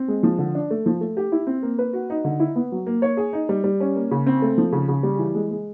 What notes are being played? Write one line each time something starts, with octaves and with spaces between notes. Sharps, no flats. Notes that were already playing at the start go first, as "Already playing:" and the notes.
Already playing: C4
G#3
F3
D3
D4
A3
F3
A3
G4
E4
C4
A#3
B4
F#4
D#4
D3
E4
B3
F#3
A#3
C#5
G#4
D#4
G3
G3
C#4
A#3
C#3
C4
A3
F3
C#3
C#3
G3
E3
G#3
G#3